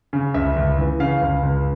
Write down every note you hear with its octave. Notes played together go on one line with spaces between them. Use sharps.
C#3
C#2 E5
C#2
E3
C#3 F5
C#2
C#2